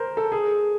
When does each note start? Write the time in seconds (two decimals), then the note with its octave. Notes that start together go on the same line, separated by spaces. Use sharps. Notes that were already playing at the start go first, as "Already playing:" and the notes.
Already playing: A#4 C5
0.17 A4
0.32 G#4